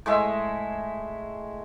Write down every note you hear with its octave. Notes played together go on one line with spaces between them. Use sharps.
A2 G#3 E5